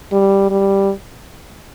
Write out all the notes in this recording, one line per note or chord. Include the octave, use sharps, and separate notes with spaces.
G3
G3